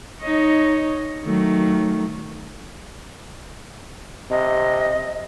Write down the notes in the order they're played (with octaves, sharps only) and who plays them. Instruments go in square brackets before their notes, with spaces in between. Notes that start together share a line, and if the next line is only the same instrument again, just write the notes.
[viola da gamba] D#4 C#5 D#5
D#3 F#3 A3
[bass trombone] C3 [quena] D#5